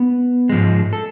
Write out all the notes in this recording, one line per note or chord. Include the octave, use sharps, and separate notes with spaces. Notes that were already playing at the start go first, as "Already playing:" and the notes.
Already playing: B3
G#2 F3 G#3
A4